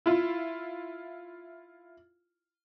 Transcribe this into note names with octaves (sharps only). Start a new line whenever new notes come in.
E4 F4